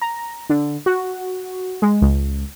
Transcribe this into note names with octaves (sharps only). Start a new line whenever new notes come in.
A#5
D3
F#4
G#3
C#2